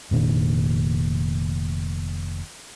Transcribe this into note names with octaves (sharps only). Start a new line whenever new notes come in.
F1 A#2 D#3 D4